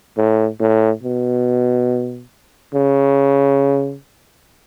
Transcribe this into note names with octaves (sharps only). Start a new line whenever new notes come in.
A2
A2
B2
C#3